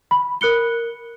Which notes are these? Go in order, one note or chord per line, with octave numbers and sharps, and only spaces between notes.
B5
A#4 F#6 C#7 G7